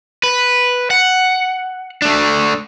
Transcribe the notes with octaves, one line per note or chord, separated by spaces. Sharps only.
B4
F#5
A3 D4